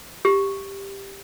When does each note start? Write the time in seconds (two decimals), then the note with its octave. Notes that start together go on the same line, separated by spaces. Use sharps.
0.25 G4